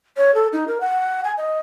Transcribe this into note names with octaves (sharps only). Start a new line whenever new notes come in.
C#5
A4
D#4
A#4
F#5
G#5
D#5